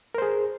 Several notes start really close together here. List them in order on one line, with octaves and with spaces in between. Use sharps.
A#4 C5 G#4